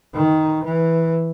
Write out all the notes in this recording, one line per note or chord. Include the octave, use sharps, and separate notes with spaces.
D#3
E3